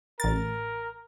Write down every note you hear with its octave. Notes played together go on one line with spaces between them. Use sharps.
A1 A#4 A6